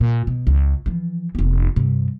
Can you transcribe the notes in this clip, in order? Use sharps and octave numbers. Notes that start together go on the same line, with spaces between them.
A#2
B2
C#2
E3 F3
F1 B3
G2 C3